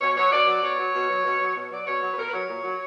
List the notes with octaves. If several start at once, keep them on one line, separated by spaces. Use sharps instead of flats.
B2 C#5
F#3 C#5
B2 D5
F#3
B2 C#5
F#3
B2
F#3
B2
F#3
B2
F#3 D5
B2 C#5
F#3
B4
B2 A#4
B4
F#3 C#5
A#2
F#3